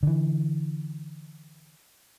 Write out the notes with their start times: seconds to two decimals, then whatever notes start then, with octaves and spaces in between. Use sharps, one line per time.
0.03 D3 E3